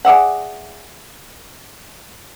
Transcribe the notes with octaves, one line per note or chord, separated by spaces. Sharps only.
G#4 D5 E5 F#5